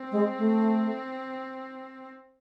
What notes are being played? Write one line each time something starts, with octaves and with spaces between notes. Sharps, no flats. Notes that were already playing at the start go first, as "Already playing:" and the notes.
Already playing: C4
G#3
A3